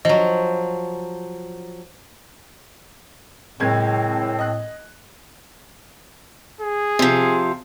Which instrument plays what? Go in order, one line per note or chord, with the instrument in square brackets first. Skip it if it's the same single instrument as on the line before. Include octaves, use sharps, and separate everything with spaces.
[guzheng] F3 F#3 [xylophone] D#5
[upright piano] F#1 G#3 G#6 [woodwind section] A2 C4
[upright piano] D#5 F#6
[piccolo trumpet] G#4
[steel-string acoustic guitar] C3 F3